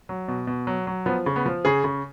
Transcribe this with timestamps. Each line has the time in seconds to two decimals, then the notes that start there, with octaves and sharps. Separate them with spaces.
0.09 F#3
0.28 B2
0.47 B2
0.67 F#3
0.87 F#3
1.06 F3 B3
1.26 C#3
1.36 B3
1.46 F3
1.65 C#3 G#4
1.84 C#3